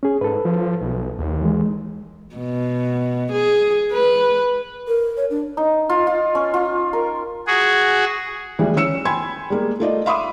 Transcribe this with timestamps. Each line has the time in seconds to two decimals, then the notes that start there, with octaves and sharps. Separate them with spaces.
0.03 C#4 G#4
0.21 G#2 A4 B4
0.45 F3
0.81 B1
1.18 D#2
1.42 E3 G#3
2.36 B2
3.33 G#4
3.92 B4
4.88 A#4
5.17 C#5
5.30 D4
5.57 D#4
5.89 F4
6.07 F4
6.35 C#4
6.54 F4
6.93 A#4
7.47 F#4 G#4
8.59 D2 E3 F3 G3 G#3
8.76 E3 C#4 E6 C#7 E7
9.05 G5 G#5 B5 C6 G#6
9.50 G3 G#3 A#3
9.80 A3 F4 D5 D#5
10.06 E5 F5 B5 C6 D6 D#6